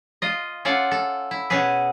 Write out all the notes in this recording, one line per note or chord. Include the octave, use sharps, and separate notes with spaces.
F4 D#5
C#4 F4 A4 D5 F#5
A4
E4
B2 C#4 G#4 B4